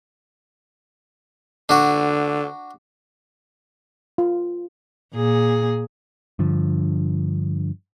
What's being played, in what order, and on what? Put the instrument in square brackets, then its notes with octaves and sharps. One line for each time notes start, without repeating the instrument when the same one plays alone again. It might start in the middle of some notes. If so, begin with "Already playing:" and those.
[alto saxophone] D3 [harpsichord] D4 F#4
[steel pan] F4
[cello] A#2 G#4
[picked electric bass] G2 D3 F3